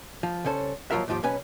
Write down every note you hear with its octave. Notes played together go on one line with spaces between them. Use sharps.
F3
C2 C#3 C#4 A4 C5
D#2 F3 F#3 F4 A#4 E5
D#2 G#2 F3 F4 G4
B1 C3 C#4 B4 G#5